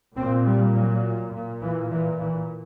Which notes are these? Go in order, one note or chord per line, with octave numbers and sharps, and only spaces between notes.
A#2 C4
G3
F#3
A#2
E3
E3
E3